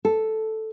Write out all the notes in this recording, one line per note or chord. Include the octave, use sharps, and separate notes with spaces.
A4